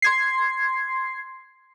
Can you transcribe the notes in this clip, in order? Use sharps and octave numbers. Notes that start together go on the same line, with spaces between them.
C6 G#6 C7